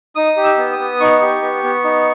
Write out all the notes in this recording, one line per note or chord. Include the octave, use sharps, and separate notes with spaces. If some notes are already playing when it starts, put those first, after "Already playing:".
D#4 D#6
G4
E6
B3
D#6
B3
D#4 C#6
G4
B3
B3
D#4